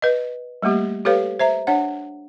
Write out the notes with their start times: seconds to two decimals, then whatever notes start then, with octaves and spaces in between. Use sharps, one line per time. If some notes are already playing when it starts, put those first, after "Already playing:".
0.02 B4 D#5
0.62 G3 A3 A#3 G4
1.05 G4 A4 B4 C#5 F5
1.39 C5 E5 A#5
1.67 D4 C#5 F#5